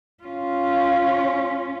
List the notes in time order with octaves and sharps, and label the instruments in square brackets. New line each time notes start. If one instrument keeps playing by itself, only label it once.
[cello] C#4 F4